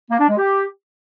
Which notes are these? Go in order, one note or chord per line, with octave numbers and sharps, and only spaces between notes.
A#3
D4
G#3
G4